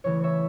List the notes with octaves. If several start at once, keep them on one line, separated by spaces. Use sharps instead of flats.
C#3 E3 A3 C#5
C#5 E5